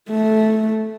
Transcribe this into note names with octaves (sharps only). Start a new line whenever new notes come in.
A3